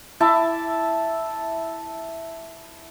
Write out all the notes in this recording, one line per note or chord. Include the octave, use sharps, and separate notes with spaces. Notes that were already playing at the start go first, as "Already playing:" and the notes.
E4 E5 A5 D6